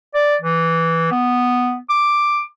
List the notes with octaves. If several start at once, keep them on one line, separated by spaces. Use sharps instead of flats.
D5
E3
B3
D6